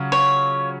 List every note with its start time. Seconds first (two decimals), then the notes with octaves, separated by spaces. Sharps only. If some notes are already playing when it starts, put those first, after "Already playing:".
Already playing: C#3 F#3 C#4 F4
0.12 C#5